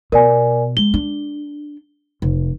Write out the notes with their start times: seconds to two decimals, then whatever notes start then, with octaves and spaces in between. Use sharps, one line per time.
0.12 B2 A#4 D5 G#5
0.77 G#3 G7
0.94 D4
2.22 F1